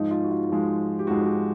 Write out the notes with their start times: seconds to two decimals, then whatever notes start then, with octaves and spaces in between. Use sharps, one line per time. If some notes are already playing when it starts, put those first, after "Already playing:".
Already playing: G#2 F3 G#3 D#4
0.11 F4
0.24 F#4
0.31 F4
0.49 G#2 F3 G#3 F#4
0.99 G4
1.07 G#2 F3 G#3 F#4
1.26 G4